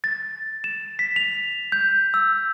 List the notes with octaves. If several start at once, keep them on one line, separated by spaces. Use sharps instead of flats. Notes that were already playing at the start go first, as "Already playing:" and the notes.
A6
E7
B6
F7
G6
E6